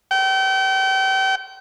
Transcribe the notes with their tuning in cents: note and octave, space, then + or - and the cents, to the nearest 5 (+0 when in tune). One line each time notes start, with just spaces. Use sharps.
G5 -35